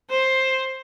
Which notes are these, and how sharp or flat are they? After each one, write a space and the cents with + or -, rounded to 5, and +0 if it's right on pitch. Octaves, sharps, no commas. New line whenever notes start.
C5 +10